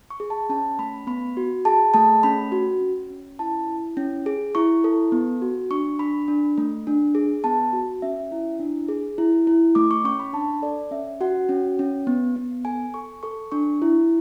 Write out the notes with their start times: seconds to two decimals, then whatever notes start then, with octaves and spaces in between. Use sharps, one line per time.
0.10 C#6
0.20 G#4
0.30 A5
0.49 C#4 A5
0.79 A3 B5
1.07 B3 B5
1.37 F#4
1.65 G#4 A5
1.94 A3 A5
2.23 C#4 B5
2.52 F#4
2.81 C#4
3.10 C#4
3.39 E4 A5
3.68 E4
3.97 C#4
4.26 G#4
4.55 E4 C#6
4.84 A4
5.12 B3
5.42 F#4
5.71 D4 C#6
5.99 D4 B5
6.28 D4
6.58 A3
6.87 D4
7.15 G#4
7.44 B3 A5
7.73 F#4
8.02 C#4 E5
8.32 E4
8.60 D4
8.88 G#4
9.18 E4
9.47 E4
9.75 A3 D6
9.91 C#6
10.04 C#4 C#6
10.20 B5
10.33 D4 A5
10.62 A4 D5
10.91 C#4 E5
11.21 F#4 F#5
11.49 C#4
11.79 C#4
12.07 B3
12.36 B3
12.65 A4 G#5
12.94 A4 C#6
13.23 A4 C#6
13.52 D4 C#6
13.82 E4